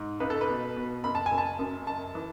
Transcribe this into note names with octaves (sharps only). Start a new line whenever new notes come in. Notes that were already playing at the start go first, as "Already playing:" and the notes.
Already playing: G#2
C#2 B4
A4
B4
B2
B2
F#1 B5
A5
G#5
F#1
A5
F#2
F#1 A5
E3